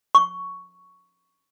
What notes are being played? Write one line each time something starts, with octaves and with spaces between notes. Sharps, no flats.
C#6